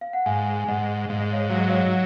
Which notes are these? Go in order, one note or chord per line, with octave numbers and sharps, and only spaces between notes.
F5
F#5
G#2 F5 G#5
G#5
G#2 D#5 F#5
G#2 F5
D#5
C#5 F5
F#3 F5
D#5
C#5 F5